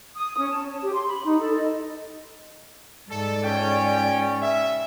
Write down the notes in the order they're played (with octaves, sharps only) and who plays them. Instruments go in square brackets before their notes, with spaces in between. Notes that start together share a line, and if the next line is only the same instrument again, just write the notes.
[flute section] D#6
C#4
A5
C#5
G4
C6
B5
D#4
A4
D#5
[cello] G#2 D5 [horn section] A4
[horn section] B3 F4 G5 [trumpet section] C#4
[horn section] B2 E5